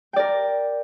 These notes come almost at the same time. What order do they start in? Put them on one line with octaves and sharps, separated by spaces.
G5 D5 A#4